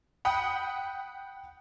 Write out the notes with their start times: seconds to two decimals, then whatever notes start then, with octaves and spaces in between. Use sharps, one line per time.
0.25 F#5 G5 B5 D#6